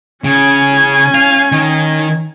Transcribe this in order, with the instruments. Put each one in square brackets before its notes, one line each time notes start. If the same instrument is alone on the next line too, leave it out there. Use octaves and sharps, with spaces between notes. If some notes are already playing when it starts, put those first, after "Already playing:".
[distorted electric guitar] C#3 [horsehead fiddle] C#4 G#5
[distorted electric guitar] F5
D#3